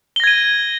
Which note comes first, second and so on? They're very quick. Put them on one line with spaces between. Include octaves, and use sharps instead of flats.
G7 A#6 G#6 D#7